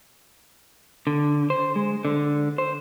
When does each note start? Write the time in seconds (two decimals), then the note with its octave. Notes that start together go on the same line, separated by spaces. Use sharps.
1.07 D3
1.50 C5
1.76 G#3
2.05 D3
2.58 C5